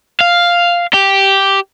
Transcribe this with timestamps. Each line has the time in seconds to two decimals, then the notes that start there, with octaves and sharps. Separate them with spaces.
0.21 F5
0.94 G4